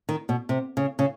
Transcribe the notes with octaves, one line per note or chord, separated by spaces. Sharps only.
D#3
B2
C3
C#3
C#3